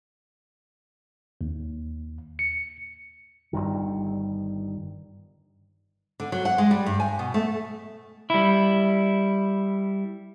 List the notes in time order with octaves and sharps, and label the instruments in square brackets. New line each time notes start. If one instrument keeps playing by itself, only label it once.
[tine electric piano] D#2
C#7
[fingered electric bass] G1 C2 G2 D#3
[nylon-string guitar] D3
F#3
F#5
G#3
G3
G2
G#5
B2
A3
[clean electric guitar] G3 E4